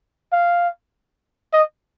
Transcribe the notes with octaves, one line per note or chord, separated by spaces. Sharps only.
F5
D#5